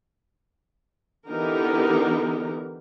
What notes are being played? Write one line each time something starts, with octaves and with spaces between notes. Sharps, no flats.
D3 E3 B3 D#4 G4 A#4